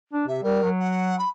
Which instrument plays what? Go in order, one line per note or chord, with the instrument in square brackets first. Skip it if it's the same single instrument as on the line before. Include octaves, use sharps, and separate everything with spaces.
[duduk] D4
[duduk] C3 [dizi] E5
[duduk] G3 [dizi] A#4
[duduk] F#3
[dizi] F#5
B5